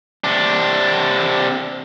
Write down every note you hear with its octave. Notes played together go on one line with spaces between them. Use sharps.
C3 D4